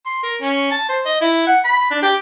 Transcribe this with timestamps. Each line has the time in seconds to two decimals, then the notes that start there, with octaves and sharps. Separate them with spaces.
0.06 C6
0.23 A#4
0.41 C#4
0.71 A5
0.89 C5
1.06 D#5
1.21 E4
1.47 F#5
1.65 B5
1.91 D4
2.03 G4